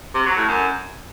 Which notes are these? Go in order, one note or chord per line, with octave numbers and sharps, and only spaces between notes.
C3
F#3
A2
F#2